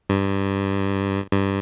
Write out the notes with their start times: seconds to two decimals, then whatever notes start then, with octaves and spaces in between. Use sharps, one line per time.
0.09 G2
1.33 G2